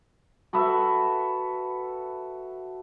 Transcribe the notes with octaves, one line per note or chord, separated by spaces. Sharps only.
F#4 A4 B4 E5